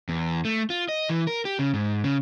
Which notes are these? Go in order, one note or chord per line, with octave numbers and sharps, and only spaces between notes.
E2
A3
F4
D#5
E3
A#4
G4
C#3
G#2
C#3